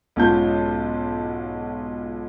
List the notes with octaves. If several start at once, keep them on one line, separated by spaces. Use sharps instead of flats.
B1 G#2 C#4 F4 A5 G6